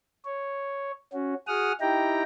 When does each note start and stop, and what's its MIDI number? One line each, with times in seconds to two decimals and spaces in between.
0.25 0.91 73
1.13 1.34 61
1.13 1.34 66
1.47 1.72 66
1.47 1.72 68
1.47 1.72 78
1.47 1.72 87
1.47 1.72 89
1.81 2.23 63
1.81 2.23 64
1.81 2.23 67
1.81 2.23 79
1.81 2.23 82